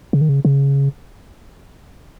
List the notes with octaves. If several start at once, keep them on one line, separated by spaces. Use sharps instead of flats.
C#3
D#3
C#3
C#3